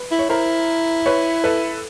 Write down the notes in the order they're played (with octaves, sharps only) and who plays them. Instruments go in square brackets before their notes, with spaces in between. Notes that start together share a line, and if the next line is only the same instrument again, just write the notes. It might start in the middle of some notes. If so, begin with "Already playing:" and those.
Already playing: [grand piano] B4
[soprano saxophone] E4
[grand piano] C#5
[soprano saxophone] E4 [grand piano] A#4 C5
[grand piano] B4 C#5
A4 B4